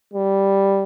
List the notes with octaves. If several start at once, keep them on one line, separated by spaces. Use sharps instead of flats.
G3